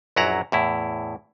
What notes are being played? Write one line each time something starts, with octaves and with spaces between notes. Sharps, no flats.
A#1 F#2 F#3 E4 F#5 A#5
E2 A2 E4